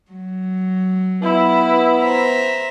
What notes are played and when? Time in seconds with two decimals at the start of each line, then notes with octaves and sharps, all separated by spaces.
0.12 F#3
1.22 B3 E4
2.02 C5 E5 A#5